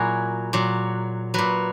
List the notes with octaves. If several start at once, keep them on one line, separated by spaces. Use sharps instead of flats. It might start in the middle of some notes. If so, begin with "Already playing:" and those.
Already playing: A#2 F#3 E4 F#4 G#4 A#4
A#2 F#3
A#2 F#3 B4